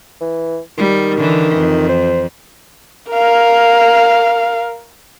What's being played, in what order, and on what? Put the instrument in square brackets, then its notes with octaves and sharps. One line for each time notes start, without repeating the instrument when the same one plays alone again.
[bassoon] E3
[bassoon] D#3 [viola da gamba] G3
[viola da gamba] D3 E3
F2
[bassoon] C5
[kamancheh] A#4 F5